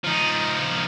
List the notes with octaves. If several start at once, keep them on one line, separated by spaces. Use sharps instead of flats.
F3 D#4